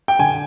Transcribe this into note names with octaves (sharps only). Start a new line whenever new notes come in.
G5
D3 G#5